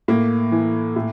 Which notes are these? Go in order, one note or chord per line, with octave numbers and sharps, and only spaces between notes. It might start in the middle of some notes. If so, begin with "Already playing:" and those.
A2 A#3
E3
A2